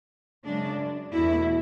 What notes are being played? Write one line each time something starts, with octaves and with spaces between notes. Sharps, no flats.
F#2 C#3 G#3 D4
E2 B2 A3 E4